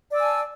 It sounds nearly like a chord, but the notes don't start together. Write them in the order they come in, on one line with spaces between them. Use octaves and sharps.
D5 E6 G#5 A5